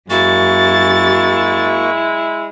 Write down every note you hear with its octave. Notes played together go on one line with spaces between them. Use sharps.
F#2 G#3 A#3 E4 F#4 C#6 A6